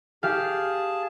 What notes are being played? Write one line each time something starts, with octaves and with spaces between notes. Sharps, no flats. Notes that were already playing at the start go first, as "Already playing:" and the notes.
G4 G#4 F5 A5